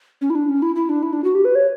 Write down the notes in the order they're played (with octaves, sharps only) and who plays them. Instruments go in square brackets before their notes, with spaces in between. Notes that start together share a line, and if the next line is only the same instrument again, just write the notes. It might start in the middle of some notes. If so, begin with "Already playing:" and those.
[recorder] C#4
E4
D4
C#4
E4
E4
D4
E4
D4
F#4
G4
B4
C#5